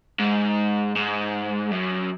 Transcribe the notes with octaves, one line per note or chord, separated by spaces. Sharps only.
G#2
G#2
F#2